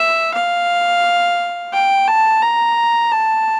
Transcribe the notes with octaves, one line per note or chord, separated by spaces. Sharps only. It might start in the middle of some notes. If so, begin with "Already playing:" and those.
Already playing: E5
F5
G5
A5
A#5
A5